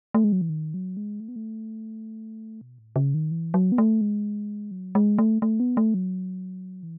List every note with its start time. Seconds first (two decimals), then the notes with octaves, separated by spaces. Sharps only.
0.14 A3
0.24 G#3
0.32 F#3
0.41 E3
0.49 D#3
0.74 F#3
0.97 G#3
1.20 A3
1.28 B3
1.36 A3
2.61 B2
2.78 A2
2.96 C#3
3.14 D#3
3.31 E3
3.54 F#3
3.72 B3
3.78 A3
4.01 G#3
4.71 F#3
4.95 G#3
5.18 A3
5.42 A3
5.60 B3
5.77 A3
5.94 F#3
6.83 E3